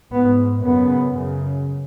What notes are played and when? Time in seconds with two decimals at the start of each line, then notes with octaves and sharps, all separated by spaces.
0.12 G#2 B3
0.63 F#2 C#3 B3
1.14 F#2 C#3